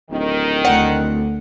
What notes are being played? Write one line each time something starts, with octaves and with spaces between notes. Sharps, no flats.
D1 D#3
D2 F#5